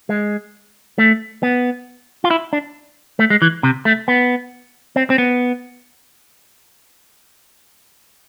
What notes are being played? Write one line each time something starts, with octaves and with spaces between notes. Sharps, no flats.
G#3
A3
B3
F4
E4
D4
A3
G#3
E3
C3
A3
B3
C4
C4
B3